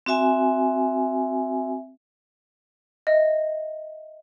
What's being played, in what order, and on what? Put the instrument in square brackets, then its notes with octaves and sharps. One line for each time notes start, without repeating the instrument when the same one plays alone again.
[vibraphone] C4 F#4 E5 G#5
[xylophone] D#5 E5